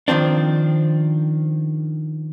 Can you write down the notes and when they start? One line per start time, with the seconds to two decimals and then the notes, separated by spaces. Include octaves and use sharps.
0.08 D#3 F3 C4 D4